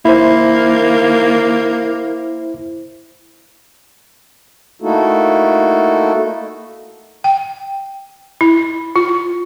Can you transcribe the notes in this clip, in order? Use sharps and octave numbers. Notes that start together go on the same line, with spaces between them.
A#3 E4 C5
A3 A#3 D#4 E4 F#4 A4
G5
E4
F4